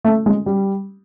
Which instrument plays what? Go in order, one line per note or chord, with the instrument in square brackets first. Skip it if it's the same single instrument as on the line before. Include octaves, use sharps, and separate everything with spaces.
[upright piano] A3
G#3
G3